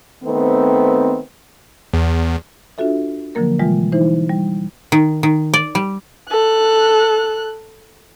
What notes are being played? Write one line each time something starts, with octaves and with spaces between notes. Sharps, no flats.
D#3 A3 B3 C4
E2
D4 F4 F#4 A4 E5
D3 F3 F#3 A#3 A#4
B2 E3 G3 G#3 F4
E3 D#4 E4 C5
G3
D#3
D#3
D5
G3
A4 F#6